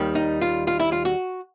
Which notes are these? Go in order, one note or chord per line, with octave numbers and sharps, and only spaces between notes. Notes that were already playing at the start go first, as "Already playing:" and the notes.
Already playing: D#2 D#3 G3
D#4
F4
F4
E4
F4
F#4